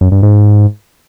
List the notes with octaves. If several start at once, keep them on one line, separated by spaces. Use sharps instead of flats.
F#2
G2
G#2